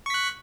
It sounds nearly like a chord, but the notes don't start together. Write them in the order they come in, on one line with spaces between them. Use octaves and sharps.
C#6 B6 F#6